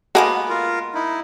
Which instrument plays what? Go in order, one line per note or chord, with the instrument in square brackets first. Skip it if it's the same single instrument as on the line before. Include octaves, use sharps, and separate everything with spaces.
[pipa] G#3 A#3 B3 [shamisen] F#4 G#4 A4
[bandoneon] F4 A#4
D#4 E4